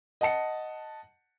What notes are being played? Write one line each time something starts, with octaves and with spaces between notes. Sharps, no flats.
D#5 F#5 A5 C#7